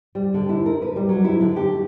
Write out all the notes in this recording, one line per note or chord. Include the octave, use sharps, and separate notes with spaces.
G3
D3
E4
A#4
B4
G3
F#3
E4
D3
G4